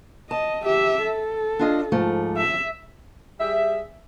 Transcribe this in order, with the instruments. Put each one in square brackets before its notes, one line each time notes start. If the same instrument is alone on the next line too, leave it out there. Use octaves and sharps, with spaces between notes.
[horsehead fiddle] D#5 [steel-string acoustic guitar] A5
[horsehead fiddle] G4 E5
A4
[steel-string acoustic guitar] D4 F4 D#5
G#2 F3 A3
[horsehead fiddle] E5
[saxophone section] G3 G#4 E5